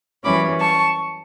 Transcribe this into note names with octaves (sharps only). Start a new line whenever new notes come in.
F#2 E3 G3 C#4 B5 D6
A5 C#6